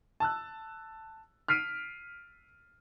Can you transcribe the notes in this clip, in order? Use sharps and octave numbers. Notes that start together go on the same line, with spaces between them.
A5 E6 F#6
F6 B6 C7 D7 D#7